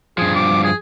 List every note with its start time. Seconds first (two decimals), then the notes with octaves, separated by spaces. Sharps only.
0.18 G2 F3 G#4
0.35 D6
0.63 G#4